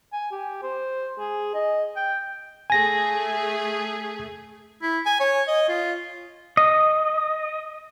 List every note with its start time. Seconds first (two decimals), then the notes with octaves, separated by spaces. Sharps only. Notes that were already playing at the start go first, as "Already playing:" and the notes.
0.13 G#5
0.31 G4
0.63 C5
1.18 G#4
1.54 D#5
1.96 G5
2.70 A3 G#4 G#5 A#6
4.82 E4
5.06 G#5
5.20 C#5
5.48 D#5
5.69 F4
6.57 D#5